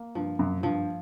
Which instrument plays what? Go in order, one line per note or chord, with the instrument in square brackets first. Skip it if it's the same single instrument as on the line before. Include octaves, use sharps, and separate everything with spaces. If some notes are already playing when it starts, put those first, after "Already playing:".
Already playing: [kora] A#3
[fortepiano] G2 [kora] F3
[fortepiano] F#2
[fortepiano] G2 [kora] F3